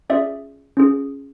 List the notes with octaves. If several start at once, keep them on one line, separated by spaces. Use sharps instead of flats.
C#4 F4 G#4 D5 E5
C#4 F4 G#4